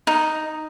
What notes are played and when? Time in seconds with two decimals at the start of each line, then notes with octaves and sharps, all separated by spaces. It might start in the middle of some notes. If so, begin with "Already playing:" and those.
0.07 D#4